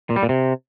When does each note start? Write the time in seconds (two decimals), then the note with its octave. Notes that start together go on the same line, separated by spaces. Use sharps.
0.10 A#2
0.16 G3
0.23 A#2
0.29 C3